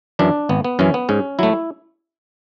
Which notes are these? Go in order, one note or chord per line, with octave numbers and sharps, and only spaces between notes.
F#2 E3 D4
G#1 B3
B3
F#2 E3 C#4
B3
G#2 C#4
F#3 A3 E4